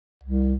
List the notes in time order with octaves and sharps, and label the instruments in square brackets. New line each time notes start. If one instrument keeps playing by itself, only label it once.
[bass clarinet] C2